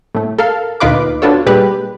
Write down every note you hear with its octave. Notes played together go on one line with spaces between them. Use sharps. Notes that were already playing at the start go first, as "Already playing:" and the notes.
A2 A3
A4 A#4 F5
D2 A#2 D#4 F4 B4 D6
B3 D4 F4 F#4 A4 C#5
A#2 G3 G#3 G4 B4